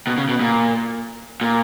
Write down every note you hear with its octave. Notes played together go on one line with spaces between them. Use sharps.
B2
C#3
B2
A#2
A#2